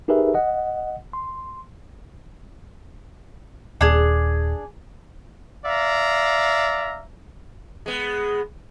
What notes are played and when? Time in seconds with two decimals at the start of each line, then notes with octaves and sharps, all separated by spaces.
0.08 D#4 G4 G#4 A#4 B4 E5
0.34 D#5 F#5
1.13 C6
3.81 D#1 D4 G#4
5.65 D5 E5 F5 A#5
7.86 G#3 B3